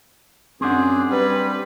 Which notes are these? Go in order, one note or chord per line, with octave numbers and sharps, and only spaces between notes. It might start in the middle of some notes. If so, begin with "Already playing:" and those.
F#2 C4 D4 G#4 F#5
G3 B4